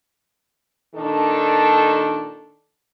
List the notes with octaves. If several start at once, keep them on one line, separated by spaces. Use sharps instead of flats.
A#2 D#3 D4 A4